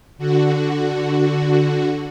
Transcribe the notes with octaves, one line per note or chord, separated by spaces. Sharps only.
D3 F#4